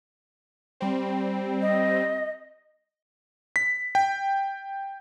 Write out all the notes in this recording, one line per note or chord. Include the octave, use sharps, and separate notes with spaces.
G3 C4
D#5
B6
G5